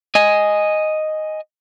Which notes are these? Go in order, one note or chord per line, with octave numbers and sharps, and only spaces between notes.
D#5 G#5